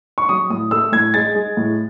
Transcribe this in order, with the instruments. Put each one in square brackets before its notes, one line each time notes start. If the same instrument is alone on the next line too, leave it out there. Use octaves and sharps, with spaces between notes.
[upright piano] C#6
F#3 D#6
A2 D#6
A3 E6
A2 G#6
G#3 A6
G#3
A2